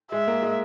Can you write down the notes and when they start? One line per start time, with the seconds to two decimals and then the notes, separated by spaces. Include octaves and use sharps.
0.12 G#3 E5
0.28 A#3
0.42 G#3